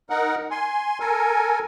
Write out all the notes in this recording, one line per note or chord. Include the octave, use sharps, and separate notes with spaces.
D#4 A#4 F#5
G#5 C6
A4 A#4 G#5